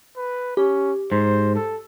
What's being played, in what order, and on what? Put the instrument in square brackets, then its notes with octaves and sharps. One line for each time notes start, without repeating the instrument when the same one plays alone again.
[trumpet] B4
[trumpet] C#4 [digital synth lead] G4
[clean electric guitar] G#2 [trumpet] C5
[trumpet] A4